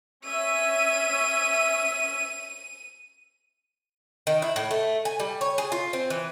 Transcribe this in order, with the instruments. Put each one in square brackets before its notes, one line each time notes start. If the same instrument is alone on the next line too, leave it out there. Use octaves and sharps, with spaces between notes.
[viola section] C#4 E5 [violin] D#7
[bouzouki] D#3
E4
A2
A3
G#5
G3
C#5
G#4
F4
C4
E3